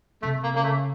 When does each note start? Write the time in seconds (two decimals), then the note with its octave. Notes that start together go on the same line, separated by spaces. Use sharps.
0.22 C3 A3
0.43 A#3
0.54 C#3 A#3
0.64 A3